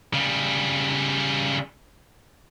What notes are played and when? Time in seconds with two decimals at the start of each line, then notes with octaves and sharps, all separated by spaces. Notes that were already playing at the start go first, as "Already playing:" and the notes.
0.14 C#3 G3